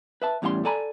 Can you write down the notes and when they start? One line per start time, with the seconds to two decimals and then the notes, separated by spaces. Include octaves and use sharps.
0.22 B4 E5 A5
0.42 E2 A2 G3 C#4 F5 C6
0.65 A4 D5 G#5 A#5 B5